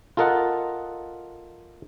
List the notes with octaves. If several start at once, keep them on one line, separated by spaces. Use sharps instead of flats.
F4 A4 A#4 D#5 F#5